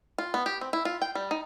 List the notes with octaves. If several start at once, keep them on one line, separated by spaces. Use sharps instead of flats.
F4
B3
G4
C4
E4
F4
G5
G3
D#4